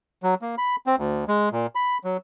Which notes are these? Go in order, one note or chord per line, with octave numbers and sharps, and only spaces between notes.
F#3
A#3
B5
C4
D2
G#3
A#2
B5
F#3